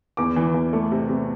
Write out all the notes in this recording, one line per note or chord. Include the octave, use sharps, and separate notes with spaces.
E2 D6
E3
E2
A3
C3
C3